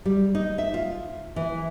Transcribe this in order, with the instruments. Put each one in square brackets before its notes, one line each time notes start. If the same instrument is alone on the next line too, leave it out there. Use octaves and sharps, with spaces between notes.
[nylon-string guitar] G3
D#4
E5
F4
E3